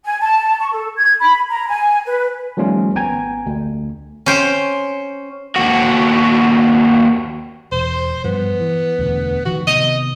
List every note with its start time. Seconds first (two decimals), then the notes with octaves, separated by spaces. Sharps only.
0.04 G#5
0.20 A5
0.59 C#6
0.71 A4
0.96 G#6
1.20 B5
1.49 A#5
1.68 G#5
2.06 B4
2.57 D#3 F3 G3 A3 C#4 F4
2.95 G#1 B3 G5 G#5 A#5 G#6
3.46 D2
4.26 C#4 C5 G5
5.56 D#2 F#4
7.72 E1 C5
8.24 G2 F3 B3
8.60 E3
8.99 E1 D2
9.45 A1 D#3 F3 F#4
9.67 C3 D#3 B3 D#5